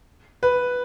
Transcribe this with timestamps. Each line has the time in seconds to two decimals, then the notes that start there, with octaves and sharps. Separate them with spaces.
0.43 B4